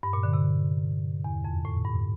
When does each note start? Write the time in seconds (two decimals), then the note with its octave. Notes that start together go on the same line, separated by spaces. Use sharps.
0.03 G2
0.13 A#2
0.23 D3
0.33 C3
1.24 E2
1.44 F2
1.65 A2
1.85 G2